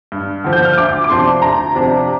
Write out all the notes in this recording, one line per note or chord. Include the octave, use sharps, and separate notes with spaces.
G2
D3 F3
G6
F6
D2 D6
D6
C3 F3 D4 C6
D2 A#5
C3 F3 D4